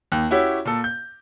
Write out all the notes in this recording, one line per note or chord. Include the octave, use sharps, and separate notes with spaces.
D#2
C#4 E4 F#4 G4 C#5
A#2 A4
G6